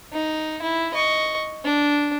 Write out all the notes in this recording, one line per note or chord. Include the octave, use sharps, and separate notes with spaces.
D#4
E4
D#5 C#6
D4